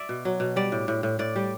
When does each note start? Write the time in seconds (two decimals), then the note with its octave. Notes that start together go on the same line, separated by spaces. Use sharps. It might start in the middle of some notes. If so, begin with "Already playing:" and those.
Already playing: D5 E5
0.09 B2
0.25 F#3
0.40 B2
0.56 G3 D5
0.72 A2
0.88 A2
1.03 A2
1.19 A2 D5
1.36 G3